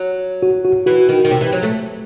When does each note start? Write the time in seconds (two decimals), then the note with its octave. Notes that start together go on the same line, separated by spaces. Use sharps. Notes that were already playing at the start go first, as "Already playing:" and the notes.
Already playing: F#3
0.43 F#4
0.65 F#4
0.86 E3 F#4
1.09 D#3
1.25 D#3
1.31 C3
1.41 E3
1.53 F#3
1.63 A3